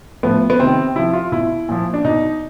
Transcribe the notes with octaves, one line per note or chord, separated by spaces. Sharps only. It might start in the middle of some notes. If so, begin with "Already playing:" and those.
A2 F3 B3
B3
C3 D#3 C4
C3 F3 E4
F4
B2 E4
A#2 F3
D4
B2 D#4